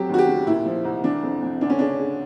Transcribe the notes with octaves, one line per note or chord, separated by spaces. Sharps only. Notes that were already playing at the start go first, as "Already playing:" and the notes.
Already playing: F2 F#3 G4
D#2 F#4
G4
C#3
A#2 E4
F3
C2
E3 D4
F2
F2
D2 D4
C#4
C#3 D4
C#3